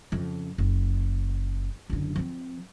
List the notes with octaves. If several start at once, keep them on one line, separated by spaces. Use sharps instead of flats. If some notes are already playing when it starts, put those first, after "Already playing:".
F2 C#3
F#1
F#1 D3
F3 C4